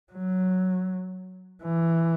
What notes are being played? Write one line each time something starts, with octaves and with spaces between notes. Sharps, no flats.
F#3
E3